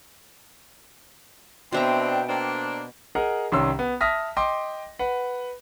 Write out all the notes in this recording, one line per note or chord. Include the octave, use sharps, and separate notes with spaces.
B2 C4 D4 E5 G5 A#5
A#3 C4 D4
G#4 A#4 D#5 F#5
C2 D#3 C#4 C6 E6
B3
E5 A5 D#6 F6 A#6 B6
D#5 G5 C6 D6
B4 F#5